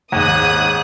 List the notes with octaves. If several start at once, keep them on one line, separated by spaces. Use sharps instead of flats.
D#2 G#2 D#6 F#6